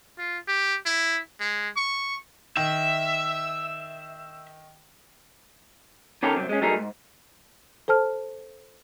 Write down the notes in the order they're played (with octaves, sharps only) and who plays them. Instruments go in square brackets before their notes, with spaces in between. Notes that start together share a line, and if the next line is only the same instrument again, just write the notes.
[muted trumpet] F4
G4
E4
G#3
C#6
[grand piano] D#3 [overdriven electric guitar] E5
[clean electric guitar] D#3 C#4 G4 A4 A#4
C2 F#2 C4
G#3 C#4
F#3 G3 A3 D#4 G#4 A#4
G#2
[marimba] A4 C5 A5 F6